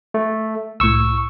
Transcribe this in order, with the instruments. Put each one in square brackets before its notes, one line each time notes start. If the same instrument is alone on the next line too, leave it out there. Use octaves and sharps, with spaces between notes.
[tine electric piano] A3
[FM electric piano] C2 A2 [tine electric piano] C#6 E6